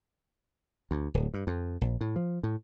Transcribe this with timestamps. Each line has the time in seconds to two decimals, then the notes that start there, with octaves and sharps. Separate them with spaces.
0.91 D2
1.14 D1
1.34 G2
1.47 F2
1.81 A#1
2.01 A2
2.16 F3
2.43 A2